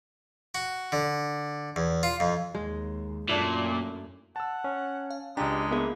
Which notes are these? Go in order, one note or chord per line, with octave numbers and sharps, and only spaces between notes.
F#4
D3
E2
F4
F2
D#2 G#3
F#2 A#2 A3 D4 E4
F#5 A5 E6
C#4
F5
C#2 G#3 D4 G4 A#5
A#3 B3 E4 G#4